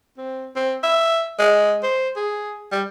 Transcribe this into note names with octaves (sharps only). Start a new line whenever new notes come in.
C4
C4
E5
G#3
C5
G#4
G3